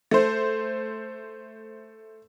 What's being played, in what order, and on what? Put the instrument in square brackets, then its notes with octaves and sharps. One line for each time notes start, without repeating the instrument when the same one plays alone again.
[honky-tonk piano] A3 C5